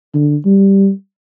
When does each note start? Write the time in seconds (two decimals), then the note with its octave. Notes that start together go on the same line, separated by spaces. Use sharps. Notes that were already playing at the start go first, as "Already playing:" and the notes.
0.14 D3
0.46 G3